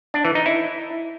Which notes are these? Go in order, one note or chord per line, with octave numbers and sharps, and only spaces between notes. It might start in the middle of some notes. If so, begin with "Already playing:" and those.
D4
E3
D#4
E4